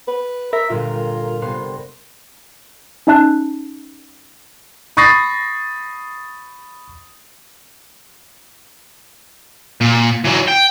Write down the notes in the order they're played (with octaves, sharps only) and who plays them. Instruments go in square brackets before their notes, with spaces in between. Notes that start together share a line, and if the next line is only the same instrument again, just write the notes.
[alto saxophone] B4
[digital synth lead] A#4 [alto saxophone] E5
[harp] G1 A#2 [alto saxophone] F4
[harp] C3 B3 C6
[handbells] C#4 D#4 E5 A5 F#6
[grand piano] B5 C#6 D#6 A6 A#6 C7
[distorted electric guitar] A#2
E3 F#3
G5